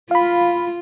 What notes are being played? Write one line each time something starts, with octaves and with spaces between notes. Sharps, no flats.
F4 F5 B5